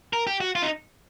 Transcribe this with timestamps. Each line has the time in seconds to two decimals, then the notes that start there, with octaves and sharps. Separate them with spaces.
0.13 A#4
0.27 G4
0.40 F#4
0.55 F4
0.62 D#4